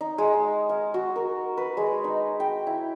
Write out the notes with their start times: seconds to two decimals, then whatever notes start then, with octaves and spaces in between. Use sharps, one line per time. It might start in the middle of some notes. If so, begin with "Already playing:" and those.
0.01 D#4
0.18 G#3
0.69 F5
0.94 F#4
1.16 A#4
1.57 B4
1.77 G#3
2.04 D#4
2.40 G5
2.67 E4